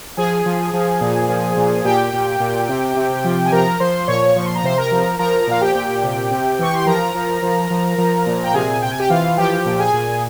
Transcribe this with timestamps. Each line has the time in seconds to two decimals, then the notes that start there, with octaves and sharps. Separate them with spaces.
0.17 F3 G#4 G#5
0.46 F3
0.73 F3
1.01 A#2
1.29 F3
1.57 A#2
1.85 A#2 G4 G5
2.13 A#2
2.40 A#2
2.69 C3
2.96 C3
3.24 F3
3.46 G#5
3.52 F3 A#4 A#5
3.80 F3 C5 C6
4.08 A#2 C#5 C#6
4.35 F3 C#6
4.46 C6
4.55 A#5
4.63 C3 C5 C6
4.77 A#4 A#5
4.91 F3
5.19 F3 A#4 A#5
5.47 A#2 F5
5.61 G4 G5
5.75 A#2
6.03 C3
6.31 C3
6.59 E3 C#6
6.75 C6
6.86 F3 A#4 A#5
7.15 F3
7.42 F3
7.70 F3
7.98 F3
8.26 A#2
8.44 G5
8.54 C3 G#4 G#5
8.82 C3 G5
8.91 G#5
8.99 G4 G5
9.10 E3 F4 F5
9.37 F3 G4 G5
9.66 A#2
9.79 G#4 G#5
9.93 A#2